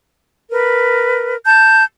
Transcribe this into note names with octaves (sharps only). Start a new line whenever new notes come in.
A#4 B4
A5 G6